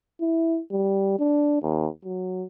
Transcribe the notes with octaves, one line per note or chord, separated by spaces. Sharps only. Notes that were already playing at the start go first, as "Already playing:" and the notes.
E4
G3
D4
D#2
F#3